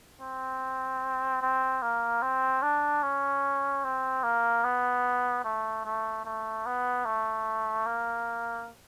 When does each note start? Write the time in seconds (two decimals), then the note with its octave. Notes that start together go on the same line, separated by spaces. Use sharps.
0.21 C4
1.41 C4
1.82 A#3
2.22 C4
2.62 D4
3.03 C#4
3.84 C4
4.23 A#3
4.64 B3
5.44 A3
5.85 A3
6.25 A3
6.66 B3
7.05 A3
7.86 A#3